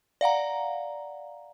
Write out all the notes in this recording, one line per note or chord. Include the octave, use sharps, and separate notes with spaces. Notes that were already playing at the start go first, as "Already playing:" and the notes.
D5 F5 F#5 A#5